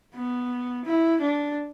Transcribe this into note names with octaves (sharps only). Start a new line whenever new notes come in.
B3
E4
D4